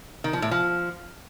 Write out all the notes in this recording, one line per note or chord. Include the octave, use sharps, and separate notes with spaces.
D#3
F3
A2
F3